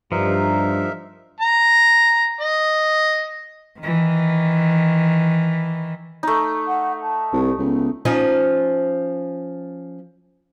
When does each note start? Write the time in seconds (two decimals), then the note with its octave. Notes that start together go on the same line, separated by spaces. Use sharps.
0.12 G2 F3 D#4 A#4 E5
1.40 A#5
2.40 D#5
3.80 D#3 E3
6.23 A3 D#4
6.68 F#5
7.02 A5
7.33 C2
7.58 C#2 B3
8.05 F3 C#4 D#4